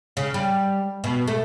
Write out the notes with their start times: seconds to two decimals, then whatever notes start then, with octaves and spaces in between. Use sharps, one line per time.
0.17 C#3
0.34 G3
1.04 B2
1.28 A3